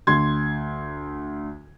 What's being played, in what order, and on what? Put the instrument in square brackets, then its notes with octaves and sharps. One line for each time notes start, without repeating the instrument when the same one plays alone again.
[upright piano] D2 C6 G#6